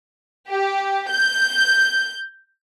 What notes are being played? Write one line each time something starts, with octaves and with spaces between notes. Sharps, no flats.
G4
G6